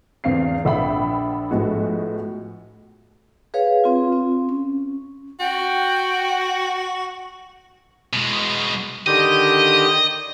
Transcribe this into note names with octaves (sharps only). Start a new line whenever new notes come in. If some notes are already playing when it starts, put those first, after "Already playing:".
E2 C4 F5 C7
A#1 E5 F#5 G5 B5
A2 F3 G#3 B3 F#4
G#4 B4 C#5 F5
C4 F4
C4
C#4
F#4 G5
B2 G#3
D3 D#3 G4 D#5